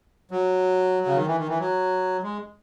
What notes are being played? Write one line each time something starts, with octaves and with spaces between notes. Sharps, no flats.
F#3
C#3
D#3
E3
D#3
E3
F#3
G#3